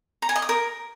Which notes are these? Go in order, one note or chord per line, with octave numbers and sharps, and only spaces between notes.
A#5
G#5
D#5
D#6
A#4